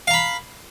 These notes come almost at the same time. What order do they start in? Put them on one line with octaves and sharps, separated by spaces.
F5 A#5 B5